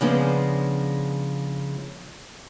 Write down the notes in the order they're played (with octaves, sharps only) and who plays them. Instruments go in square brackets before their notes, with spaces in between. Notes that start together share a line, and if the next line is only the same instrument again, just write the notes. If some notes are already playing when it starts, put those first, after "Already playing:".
[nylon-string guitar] C#3 F3 G#3 B3 D4 C5